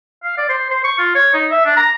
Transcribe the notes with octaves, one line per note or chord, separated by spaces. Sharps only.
F5
D5
C5
C5
C#6
F4
C#5
D#4
E5
D4
A#5